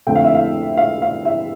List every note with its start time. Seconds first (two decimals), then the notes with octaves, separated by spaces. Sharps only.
0.07 F2 D3 A3 G5
0.15 F5
0.24 E5
0.35 F5
0.77 F5
1.02 F5
1.25 E5